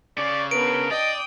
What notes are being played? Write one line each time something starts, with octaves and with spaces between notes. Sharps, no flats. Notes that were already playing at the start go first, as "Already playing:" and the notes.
C#3 C#4 D5
B3 D4 A#4 D7
D5 D#5 G5 D#6